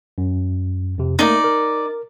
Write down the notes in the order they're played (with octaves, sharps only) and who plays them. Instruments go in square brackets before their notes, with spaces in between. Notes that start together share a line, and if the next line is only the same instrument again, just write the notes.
[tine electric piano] F#2
F2 C3
[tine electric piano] A3 A#3 A#4 [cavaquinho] D#4 D5
[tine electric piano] A#4